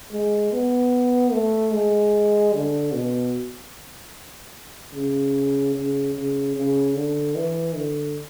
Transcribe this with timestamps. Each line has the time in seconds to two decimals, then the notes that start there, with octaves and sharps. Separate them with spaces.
0.12 G#3
0.53 B3
1.32 A3
1.73 G#3
2.54 D3
2.93 B2
4.94 C#3
5.75 C#3
6.14 C#3
6.55 C#3
6.94 D3
7.35 E3
7.75 D3